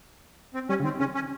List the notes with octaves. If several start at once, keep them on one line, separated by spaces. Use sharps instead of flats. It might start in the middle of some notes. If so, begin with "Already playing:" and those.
C4
G3 C#4
C#3
D#3 C4
C#3 C#4
C#4